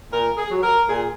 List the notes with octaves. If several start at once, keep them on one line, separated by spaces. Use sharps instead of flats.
A#2 A#4
G#4
F#3
A#4
A#2 G#4